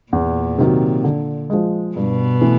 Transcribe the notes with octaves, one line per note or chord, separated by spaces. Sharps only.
E2 A#2
C3 D#3 F#3
D3
F3 G#3
G2 B2
E3 A3